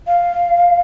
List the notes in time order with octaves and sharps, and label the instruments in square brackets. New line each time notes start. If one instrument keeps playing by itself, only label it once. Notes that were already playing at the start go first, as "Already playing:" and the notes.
[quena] F5